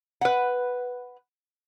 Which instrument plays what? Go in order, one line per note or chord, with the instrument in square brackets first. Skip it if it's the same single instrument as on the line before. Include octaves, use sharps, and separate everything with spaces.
[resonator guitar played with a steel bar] B4 F#5